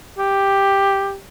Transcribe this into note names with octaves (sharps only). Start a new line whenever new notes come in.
G4